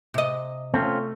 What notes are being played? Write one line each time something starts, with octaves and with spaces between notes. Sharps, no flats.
C3 D#5
A3 C4 C#4 F4